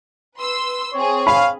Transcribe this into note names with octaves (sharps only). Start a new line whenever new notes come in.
B4 C6 E6
C4 G#4 C#5
F5 B5